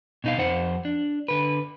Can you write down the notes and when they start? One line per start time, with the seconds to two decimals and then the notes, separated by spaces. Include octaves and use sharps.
0.24 B2 D#4 F5
0.37 F2 F3 C5 F#5
0.85 D4
1.28 D3 B4